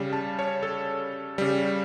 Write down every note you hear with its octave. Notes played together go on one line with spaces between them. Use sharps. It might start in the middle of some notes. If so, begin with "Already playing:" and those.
Already playing: C#3 G3
A5
C#5
A4
C#3 G3